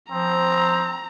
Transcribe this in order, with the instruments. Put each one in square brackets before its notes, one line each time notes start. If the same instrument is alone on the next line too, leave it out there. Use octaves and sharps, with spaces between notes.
[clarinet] F3 [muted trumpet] C4 [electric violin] A#5